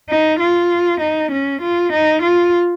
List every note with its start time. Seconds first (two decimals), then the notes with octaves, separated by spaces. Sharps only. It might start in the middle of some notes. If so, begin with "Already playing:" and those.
0.10 D#4
0.40 F4
1.00 D#4
1.32 C#4
1.61 F4
1.93 D#4
2.22 F4